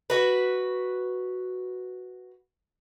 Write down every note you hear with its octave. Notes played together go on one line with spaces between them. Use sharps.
F#4 B4